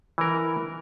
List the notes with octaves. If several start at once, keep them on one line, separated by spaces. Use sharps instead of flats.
E3 A#4